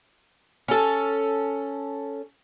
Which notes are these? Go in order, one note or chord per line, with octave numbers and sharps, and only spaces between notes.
C#4 A4